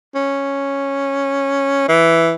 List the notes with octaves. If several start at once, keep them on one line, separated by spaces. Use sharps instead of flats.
C#4
E3